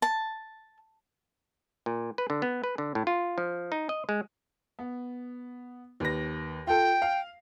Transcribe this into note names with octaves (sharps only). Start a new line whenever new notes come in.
A5
A#2
B4
D3
B3
B4
D3
A2
F4
F3
D#4
D#5
G#3
B3
D#2 B4 A#6
F4 A4 G5
F5